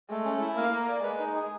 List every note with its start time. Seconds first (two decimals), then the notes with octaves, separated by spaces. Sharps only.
0.10 G#3 A3
0.25 C#4
0.41 E4
0.57 A#3 F5
0.72 A#4
0.88 D5
1.03 G#3 B4
1.19 D#4
1.35 G#4